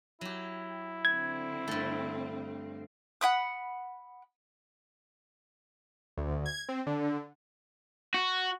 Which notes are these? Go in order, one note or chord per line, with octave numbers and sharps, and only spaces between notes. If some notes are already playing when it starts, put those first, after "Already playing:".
F#3 E4 G4
D3 C4 G#6
G2 A3
F#5 B5 D#6
D2
G#6
C4
D3
F#4